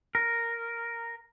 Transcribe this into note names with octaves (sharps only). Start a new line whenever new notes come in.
A#4